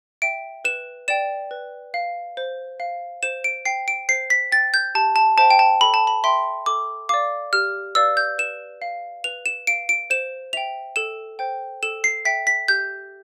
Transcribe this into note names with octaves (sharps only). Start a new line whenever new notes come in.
E5 G5 D7
B4 E7
D5 G5 E7
B4
F5
C5
F5
C5 E7
D7
G5 C7
D7
C5 C7
B6
G5 A6
G6
G4 A5
A5
C5 E5 G5 A5
G5
A5
A4 B5
A5
B5
E5 G5 C6
A4 D6
D5 F5 D6
G4 F6
B4 D5 F5 E6
G6
B4 E7
F5
B4 F7
E7
F5 D7
D7
C5 E7
E5 G5 F7
A4 E7
C5 G5
A4 E7
C7
E5 G5 B6
B6
G4 G6